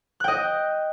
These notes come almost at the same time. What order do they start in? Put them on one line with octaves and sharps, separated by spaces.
F#6 G5 D#5